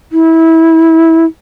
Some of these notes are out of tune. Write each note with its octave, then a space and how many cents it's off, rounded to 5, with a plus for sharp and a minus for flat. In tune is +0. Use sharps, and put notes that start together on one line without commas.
E4 -20